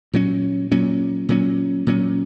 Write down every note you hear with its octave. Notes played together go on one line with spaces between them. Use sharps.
A#2 F#3 C#4
A#2 F#3 C#4
A#2 F#3 C#4
A#2 F#3 C#4